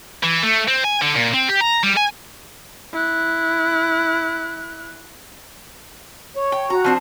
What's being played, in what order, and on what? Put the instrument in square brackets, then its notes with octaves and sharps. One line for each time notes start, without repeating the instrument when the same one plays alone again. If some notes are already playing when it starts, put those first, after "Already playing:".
[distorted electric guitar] E3
A3
C4
G#5
D3
A#2
C4
G4
A#5
G3
G#5
[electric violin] E4 F#6
[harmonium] C#5
[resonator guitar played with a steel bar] G5
[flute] F#4 [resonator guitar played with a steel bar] A#5
[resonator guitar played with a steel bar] F3 C4 D4